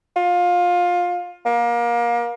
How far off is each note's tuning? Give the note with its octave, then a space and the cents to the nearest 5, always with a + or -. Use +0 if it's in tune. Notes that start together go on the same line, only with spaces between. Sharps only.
F4 +20
A#3 +30